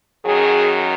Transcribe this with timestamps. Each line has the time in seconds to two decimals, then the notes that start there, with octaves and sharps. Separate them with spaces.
0.25 F#2 D#3 F#3 G#4